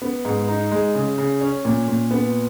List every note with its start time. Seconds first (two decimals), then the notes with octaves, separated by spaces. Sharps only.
0.02 B3
0.25 G#2
0.48 D#4
0.71 G#3
0.95 C#3
1.18 C#3
1.41 C#4
1.65 A#2
1.88 A#2
2.11 B3